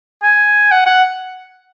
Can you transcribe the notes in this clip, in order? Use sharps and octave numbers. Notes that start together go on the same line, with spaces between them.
G#5
F#5
F#5